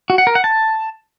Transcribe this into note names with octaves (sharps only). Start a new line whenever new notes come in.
F#4
F#5
A#4
F#5
A5